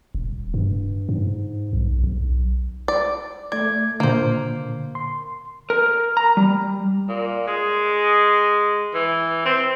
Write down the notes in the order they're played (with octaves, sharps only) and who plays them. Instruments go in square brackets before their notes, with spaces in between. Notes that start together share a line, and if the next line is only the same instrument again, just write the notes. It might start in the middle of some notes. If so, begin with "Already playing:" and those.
[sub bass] D#1
G2
G#2
B1
B1
[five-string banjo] D5
[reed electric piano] A3 G#6 [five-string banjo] D5
[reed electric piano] A#2 D3 [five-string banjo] A#3 C5
[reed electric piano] C6
[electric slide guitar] A#4
A#5
G3
[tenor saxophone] A#2
G#3
E3
C4